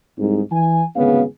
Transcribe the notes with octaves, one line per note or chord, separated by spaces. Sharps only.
C2 G#2
E3 G#5
G#1 D2 C#3 B3 G#4 F5